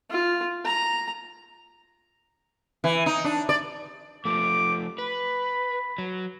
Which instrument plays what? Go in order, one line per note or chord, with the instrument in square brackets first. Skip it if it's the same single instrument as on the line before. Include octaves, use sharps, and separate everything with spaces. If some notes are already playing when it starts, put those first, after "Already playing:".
[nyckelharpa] F4
A#5
[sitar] E3
D#4
D4
D5
[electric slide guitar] F3 A3 [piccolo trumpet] D6
[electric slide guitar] B4 [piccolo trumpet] B5
[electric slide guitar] F#3